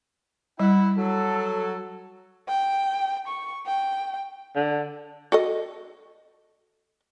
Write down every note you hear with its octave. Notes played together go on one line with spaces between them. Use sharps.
G3 E4 F#5
F#3 A4
G5
C#6
G5
D3
F#4 A4 D#5